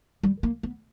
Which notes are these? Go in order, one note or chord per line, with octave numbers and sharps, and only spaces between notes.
G3
A#3
B3